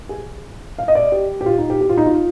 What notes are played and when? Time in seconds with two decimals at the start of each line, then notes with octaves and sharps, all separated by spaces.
0.09 G#4
0.78 F5
0.88 D#5
0.95 D5
1.12 G4
1.41 G4
1.46 F4
1.58 D#4
1.70 G4
1.81 G4
1.89 F4
1.98 D#4
2.06 F4